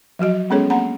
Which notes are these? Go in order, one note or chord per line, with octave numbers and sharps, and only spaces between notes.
F3 F#3 F#4 D#5
G#3 B3 C#4 G#4 A4 C#5
A#3 C4 F#5 A#5